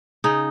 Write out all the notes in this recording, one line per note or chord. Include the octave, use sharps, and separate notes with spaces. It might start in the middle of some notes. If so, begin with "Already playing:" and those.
C#3 D#4